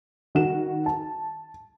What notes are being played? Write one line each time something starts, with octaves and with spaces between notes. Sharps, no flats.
D#3 F#4 E7
A5